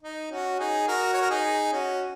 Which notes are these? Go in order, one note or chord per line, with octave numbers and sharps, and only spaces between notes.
D#4
C#4 F#4
D#4 G#4
F#4 A#4
C#5
A#4
D#4 G#4
C#4 F#4